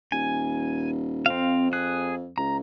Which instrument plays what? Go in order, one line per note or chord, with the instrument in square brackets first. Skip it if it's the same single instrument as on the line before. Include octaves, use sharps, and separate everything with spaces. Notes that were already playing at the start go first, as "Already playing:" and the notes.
[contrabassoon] D#1 [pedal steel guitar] G#5
[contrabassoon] F2 [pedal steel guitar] C4 F5
[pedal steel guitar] G#4 F#6
[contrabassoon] C#2 [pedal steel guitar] A#5